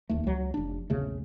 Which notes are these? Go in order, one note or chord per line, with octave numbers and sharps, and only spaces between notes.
D1 D#2 A3
C#2 F#3
F1 D4
A#1 E2 C#3 A3